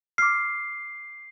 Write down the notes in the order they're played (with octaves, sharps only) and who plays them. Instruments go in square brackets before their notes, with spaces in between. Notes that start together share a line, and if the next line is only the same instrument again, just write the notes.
[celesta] D6 F6 [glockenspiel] C7